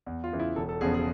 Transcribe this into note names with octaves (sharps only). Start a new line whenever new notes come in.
E2
F4
C#3 E3
E4
E1 A4
A4
E2 C#3 F3 G#4
G#4